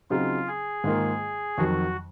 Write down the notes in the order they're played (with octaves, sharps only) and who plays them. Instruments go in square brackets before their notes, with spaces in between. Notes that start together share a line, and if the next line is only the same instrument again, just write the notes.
[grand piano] C#3 F#3 C4 D#4 [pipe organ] F4
[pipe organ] G#4
[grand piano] G#2 D#3 A#3 F4
[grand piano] F2 D#3 F#3 [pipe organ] F#4